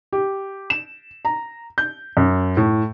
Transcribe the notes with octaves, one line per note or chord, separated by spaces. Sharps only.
G4
E7
A#5
G6
F#2
A2